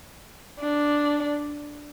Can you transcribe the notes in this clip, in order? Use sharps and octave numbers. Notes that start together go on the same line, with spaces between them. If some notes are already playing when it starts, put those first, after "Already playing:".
D4